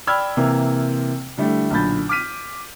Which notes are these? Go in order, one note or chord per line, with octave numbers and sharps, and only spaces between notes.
D5 G5 B5 E6 F6 G#6
C3 E3 A#3 C4
D3 G3 A3 E4
B1 A#2 D3 B5 G6 A6
D6 F6 B6 D#7